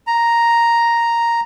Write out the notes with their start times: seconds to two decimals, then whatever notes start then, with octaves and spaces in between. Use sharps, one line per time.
0.07 A#5